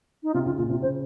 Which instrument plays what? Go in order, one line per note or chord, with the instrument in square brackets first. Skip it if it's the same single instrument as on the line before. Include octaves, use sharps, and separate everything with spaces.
[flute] D#4
[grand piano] C3 [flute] F4
[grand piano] C#3 [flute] F4
[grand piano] A#2 [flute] F4
[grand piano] C3 [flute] F4
[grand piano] C#3 [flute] C5